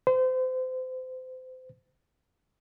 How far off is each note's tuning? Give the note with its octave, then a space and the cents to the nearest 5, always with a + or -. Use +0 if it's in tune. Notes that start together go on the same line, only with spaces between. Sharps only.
C5 -30